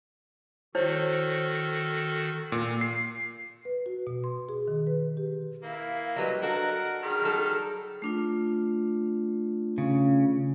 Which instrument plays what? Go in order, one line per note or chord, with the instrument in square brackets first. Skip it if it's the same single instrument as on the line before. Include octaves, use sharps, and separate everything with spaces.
[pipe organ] D#3 F#4 A4 [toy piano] E4 C5 C#5
[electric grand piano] A#2
C7
[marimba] B4
F#4
B2
C6
G#4
D#3
B4
G4
[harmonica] A#3 E4 [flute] F5
[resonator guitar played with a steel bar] F#3 G3 B4 [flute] D#5
[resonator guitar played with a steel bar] D4 F#4 A4 [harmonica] A#4 F#5
[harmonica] D#3 G3 F6 [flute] G#4
[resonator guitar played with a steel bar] F#3 A4
[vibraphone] A3 D4 F4
[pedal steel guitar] C#3